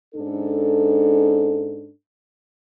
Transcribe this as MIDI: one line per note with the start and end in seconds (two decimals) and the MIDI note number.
0.14 1.89 44
0.14 1.89 61
0.14 1.89 62
0.14 1.89 69